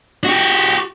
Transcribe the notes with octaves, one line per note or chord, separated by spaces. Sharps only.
F#4 G4